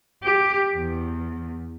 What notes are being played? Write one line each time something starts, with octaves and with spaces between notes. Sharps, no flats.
G4
E2